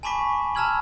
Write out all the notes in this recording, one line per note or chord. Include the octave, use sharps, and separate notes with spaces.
G#5 A5 B5 C#6 D6 B6
A5 A#5 E6 F6 G#6 F#7